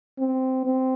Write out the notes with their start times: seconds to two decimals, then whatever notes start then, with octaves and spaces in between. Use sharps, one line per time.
0.19 C4
0.65 C4